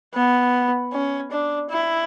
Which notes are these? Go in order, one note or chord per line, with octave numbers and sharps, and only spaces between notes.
B3
C#4
D4
E4